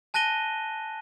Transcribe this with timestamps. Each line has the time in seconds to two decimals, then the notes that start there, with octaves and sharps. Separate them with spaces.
0.14 G#5 A5 F#6 A#6 D#7 G7